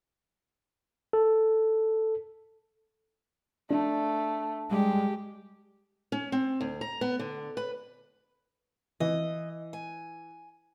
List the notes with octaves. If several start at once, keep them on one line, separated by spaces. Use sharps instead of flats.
A4
A3 D4
G3 G#3 G4
C#4
C4
D2
A#5
B3
D3
B4
E3 D#5
G#5